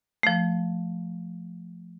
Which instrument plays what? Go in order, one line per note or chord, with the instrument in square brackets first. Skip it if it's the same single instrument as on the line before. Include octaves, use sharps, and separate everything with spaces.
[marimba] F3 A3